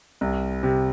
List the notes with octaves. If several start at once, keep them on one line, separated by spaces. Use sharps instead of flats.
C2
C3